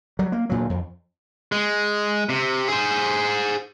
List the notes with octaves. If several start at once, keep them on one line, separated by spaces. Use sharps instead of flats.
F#3 G3
A#3
D2 A#2 F#3
F2
G#3
C3
G#4 C5